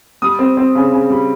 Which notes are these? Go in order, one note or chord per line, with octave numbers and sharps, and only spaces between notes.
G3 D#6
C4
C4
C#3
C#3
G3